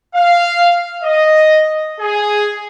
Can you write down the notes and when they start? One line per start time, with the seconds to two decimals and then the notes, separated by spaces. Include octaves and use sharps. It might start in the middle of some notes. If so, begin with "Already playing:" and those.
0.15 F5
1.03 D#5
2.00 G#4